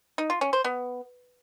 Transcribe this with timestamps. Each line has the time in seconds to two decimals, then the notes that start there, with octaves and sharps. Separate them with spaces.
0.18 D#4
0.30 F4
0.41 C#4
0.53 C5
0.64 B3